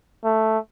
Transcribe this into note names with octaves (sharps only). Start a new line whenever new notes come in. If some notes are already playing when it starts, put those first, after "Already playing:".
A3